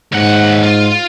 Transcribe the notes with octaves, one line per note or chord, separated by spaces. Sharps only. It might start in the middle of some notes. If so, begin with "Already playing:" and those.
D#2 G#2 F#5
F4